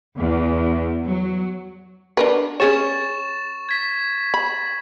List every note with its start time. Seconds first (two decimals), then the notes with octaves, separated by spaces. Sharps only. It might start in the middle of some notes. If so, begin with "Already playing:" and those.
0.16 E2
1.07 F#3
2.17 D4 A#4 B4
2.60 C#4 G#4 C#5 C#6 A6 E7
3.69 G#6 B6
4.34 B5